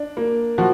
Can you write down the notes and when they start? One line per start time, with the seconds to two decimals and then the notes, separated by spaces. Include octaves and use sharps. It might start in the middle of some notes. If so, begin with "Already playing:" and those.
Already playing: D4
0.17 A#3
0.58 F3 F#4